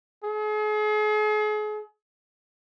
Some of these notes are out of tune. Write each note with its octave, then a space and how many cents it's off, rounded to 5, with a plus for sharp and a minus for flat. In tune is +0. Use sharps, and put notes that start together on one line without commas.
G#4 +40